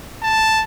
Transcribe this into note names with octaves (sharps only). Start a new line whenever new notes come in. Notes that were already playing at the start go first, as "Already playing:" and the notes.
A5